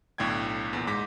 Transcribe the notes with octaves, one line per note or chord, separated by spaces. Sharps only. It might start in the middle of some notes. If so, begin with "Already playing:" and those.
B1 A2 D3 G5 G#6
E2 A#2
G#2 D6 A#6 B6